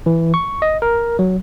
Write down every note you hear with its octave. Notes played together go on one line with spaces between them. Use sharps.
E3
C#6
D#5
A#4
F#3